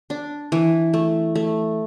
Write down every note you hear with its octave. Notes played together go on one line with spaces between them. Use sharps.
D4
E3
A3
A3